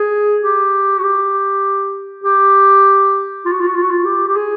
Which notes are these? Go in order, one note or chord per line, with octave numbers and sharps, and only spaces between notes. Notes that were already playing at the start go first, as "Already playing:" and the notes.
Already playing: G#4
G4
F#4
G4
G4
F4
F#4
F4
F#4
F4
F#4
F4
G4
G4
G#4